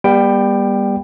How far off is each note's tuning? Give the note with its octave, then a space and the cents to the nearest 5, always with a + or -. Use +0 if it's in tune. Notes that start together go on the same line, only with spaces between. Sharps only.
G3 +20 B3 -40 G5 +0